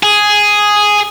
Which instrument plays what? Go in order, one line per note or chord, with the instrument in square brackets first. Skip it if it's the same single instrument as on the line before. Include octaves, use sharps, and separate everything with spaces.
[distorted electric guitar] G#4